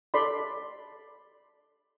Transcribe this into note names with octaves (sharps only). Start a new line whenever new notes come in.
A4 D5 B5 C6